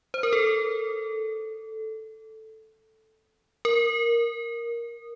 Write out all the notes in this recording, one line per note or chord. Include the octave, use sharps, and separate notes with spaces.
C5
A#4
A4
A#4